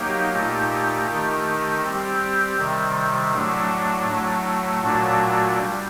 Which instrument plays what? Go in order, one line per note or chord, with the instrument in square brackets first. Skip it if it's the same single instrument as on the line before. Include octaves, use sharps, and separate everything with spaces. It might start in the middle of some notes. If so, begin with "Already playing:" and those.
Already playing: [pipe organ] F#3 A#3 D#4 G4
A#2 A3 D#4 G4
D#3 A3 D#4 G4
G3 C4 G4
C3 D#3 G3
A2 F#3 A3 D4
A2 F#3 A3
A#2 F#3 A3 D4 F#4
G3